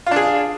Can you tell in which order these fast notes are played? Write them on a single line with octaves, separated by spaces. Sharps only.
F4 D4 G#4